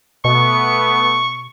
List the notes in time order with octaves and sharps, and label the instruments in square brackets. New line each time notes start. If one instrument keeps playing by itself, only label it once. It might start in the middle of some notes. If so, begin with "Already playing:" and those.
[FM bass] B2 [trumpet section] A3 B3 [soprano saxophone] C#6